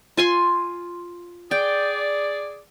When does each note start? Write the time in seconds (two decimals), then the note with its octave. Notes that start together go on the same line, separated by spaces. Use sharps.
0.17 F4 G#5 C6
1.51 G#4 D5 G5